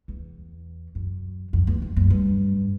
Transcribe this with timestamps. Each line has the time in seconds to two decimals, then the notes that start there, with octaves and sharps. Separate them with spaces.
0.08 E2
0.95 F#2
1.53 F2
1.67 E2
1.82 F2
1.96 F#2
2.10 G2